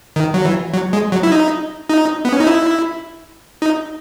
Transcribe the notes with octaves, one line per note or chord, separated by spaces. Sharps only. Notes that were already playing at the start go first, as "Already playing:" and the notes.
D#3
F#3
E3
F#3
G#3
F#3
E4
D#4
D#4
B3
C#4
D#4
E4
D#4